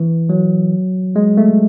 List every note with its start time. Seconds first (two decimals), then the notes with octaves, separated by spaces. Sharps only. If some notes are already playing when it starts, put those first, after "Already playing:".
Already playing: E3
0.29 F#3
1.16 G#3
1.37 A3